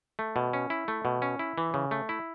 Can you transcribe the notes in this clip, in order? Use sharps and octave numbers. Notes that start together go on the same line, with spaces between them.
A3
B2
C#4
E4
A3
B2
C#4
E4
E3
C#3
A3
E4